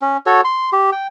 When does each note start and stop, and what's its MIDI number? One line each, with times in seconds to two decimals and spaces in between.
0.02 0.17 61
0.26 0.41 66
0.26 0.41 69
0.26 0.41 73
0.44 0.70 84
0.73 0.90 67
0.92 1.07 79